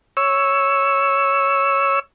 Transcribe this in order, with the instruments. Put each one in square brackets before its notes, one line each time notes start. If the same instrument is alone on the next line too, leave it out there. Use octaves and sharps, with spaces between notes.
[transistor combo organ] C#5 E6